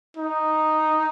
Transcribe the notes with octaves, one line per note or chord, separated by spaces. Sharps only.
D#4